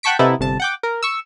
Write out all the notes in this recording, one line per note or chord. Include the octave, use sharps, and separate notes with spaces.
F#5 G5 A5 C#6 B6 D7
C3 B3 D#4 E4 A4
G1 C3 A5
F#5 G5 D6
A#4
C#6 E6